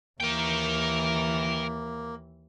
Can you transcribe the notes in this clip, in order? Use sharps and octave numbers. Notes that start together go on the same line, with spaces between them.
D#2 E3 A#3 A#4 G5